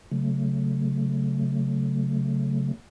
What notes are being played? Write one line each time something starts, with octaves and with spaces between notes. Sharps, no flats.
C#3 F#3 A3